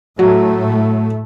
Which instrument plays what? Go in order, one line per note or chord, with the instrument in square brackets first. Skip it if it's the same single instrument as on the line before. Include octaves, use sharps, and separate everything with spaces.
[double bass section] A2 A3 [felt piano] F#3